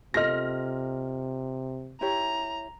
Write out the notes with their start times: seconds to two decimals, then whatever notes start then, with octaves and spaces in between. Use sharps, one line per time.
0.14 C3 F4 A4 D#5 F6 A#6
2.01 E4 G4 C#5 A#5